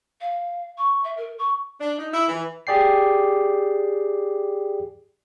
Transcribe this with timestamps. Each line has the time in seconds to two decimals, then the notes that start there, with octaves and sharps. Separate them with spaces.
0.20 F5
0.77 C#6
1.03 E5
1.17 A#4
1.38 C#6
1.81 D4
1.98 D#4
2.13 E4
2.28 E3
2.67 G4 G#4 D5 G5 C7